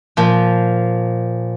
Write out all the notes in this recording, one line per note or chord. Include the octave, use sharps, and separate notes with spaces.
A#2 F3